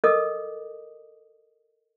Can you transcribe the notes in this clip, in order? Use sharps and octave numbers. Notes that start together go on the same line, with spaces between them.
A4 A#4 D#5 D6 D#6